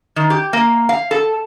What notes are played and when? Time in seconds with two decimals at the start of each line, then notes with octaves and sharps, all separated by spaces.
0.16 D#3
0.30 G4
0.53 A#3
0.89 F5
1.11 A4